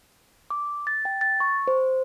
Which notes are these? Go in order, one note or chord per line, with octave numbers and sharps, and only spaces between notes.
D6
A6
G5
A6
C#6
C5